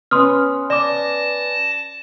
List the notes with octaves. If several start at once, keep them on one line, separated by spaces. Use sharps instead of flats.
B3 C#4 C6 D#6 F6
D5 A5 D6 A#6